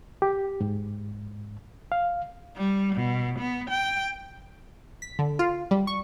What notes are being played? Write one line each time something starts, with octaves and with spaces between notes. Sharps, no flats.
G4
G#2
F5
G3
B2
B3
G5
B6
D3
F4
G3
C#6